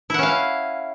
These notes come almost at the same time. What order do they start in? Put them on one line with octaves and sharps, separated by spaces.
E4 F#5 C#4 F5